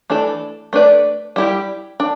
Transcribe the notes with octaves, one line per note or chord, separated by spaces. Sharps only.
E3 A3 D4 A4 D5
A3 D4 B4 D5
G3 E4 G4
D4